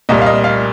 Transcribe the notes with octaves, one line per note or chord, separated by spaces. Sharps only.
C2 A#2 G3 D#5
F5
D#5
F5